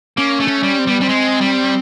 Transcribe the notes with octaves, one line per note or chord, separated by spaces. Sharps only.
A#3 C#4
A3
C#4
G3
C4
G3 B3
G3 C4
G#3
G3